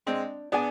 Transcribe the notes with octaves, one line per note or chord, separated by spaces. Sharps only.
G#3 C4 D4
B3 D4 G#4 D5 G#5